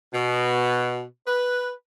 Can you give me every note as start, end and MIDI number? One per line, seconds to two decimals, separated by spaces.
0.14 1.03 47
1.27 1.72 71